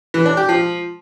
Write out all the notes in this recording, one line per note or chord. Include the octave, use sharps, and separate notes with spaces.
E3
D4
G4
F3